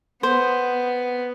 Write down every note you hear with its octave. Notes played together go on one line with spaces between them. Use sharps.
B3 C5